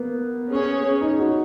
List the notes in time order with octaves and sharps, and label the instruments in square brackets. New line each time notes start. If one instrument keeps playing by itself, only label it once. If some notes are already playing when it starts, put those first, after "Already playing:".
Already playing: [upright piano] A#3 B3
[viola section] C#4 G#4 C#5
[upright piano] D#4
F#4